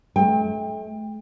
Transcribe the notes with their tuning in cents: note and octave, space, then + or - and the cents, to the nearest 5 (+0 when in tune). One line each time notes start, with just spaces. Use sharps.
A3 -40 G5 +30